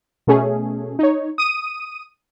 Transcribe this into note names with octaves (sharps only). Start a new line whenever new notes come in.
B2 A3 C#4 G#4
D#4 C#5
D#6 D#7